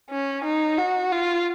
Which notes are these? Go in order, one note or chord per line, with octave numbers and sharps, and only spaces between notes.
C#4
D#4
F#4
F4